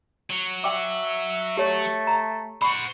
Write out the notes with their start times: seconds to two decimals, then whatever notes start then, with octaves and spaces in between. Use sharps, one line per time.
0.30 F#3
0.64 E5 F#5 G5 D6
1.57 A3 G4 C#5
2.07 A#5
2.62 C5 F#5 B5 C#6